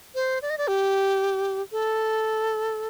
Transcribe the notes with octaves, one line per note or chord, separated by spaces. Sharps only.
C5
D5
D#5
D5
G4
A4